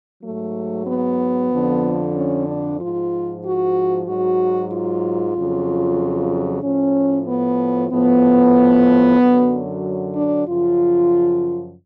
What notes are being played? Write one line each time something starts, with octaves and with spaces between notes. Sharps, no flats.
G#2 F#3 A3
B3
F2 D3 F3
C#4
D4
G#2 F3 F4
F#4
G#2 F#3 F#4
F4
F2 C#3 F#3
A2 F3 C#4
B3
A2 F3 B3
F#2 D3 F#3
D4
F#2 C#3 F3 F4